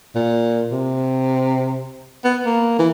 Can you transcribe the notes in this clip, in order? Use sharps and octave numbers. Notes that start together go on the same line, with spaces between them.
A#2
C3
B3
A#3
E3